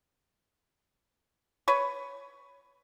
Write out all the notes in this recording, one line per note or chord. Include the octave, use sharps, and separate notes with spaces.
B4 C#5